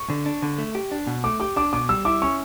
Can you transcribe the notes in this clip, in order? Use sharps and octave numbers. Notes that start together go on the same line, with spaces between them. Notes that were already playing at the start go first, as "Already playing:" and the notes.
Already playing: C#6
D3
D4
D3
A3
G4
D4
B2
A3 D6
G4 D6
D4 D6
B2 D6
G3 E6
E4 D6
C#4 C#6